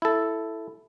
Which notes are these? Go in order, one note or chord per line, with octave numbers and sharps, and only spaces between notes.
E4 A4